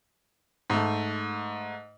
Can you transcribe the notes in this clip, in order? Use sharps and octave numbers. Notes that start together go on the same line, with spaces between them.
G#2 A3